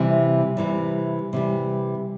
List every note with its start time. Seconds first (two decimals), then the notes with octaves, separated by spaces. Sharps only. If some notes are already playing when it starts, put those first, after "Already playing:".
Already playing: C3 E3 G3
0.57 C3 E3 G3
1.33 C3 E3 G3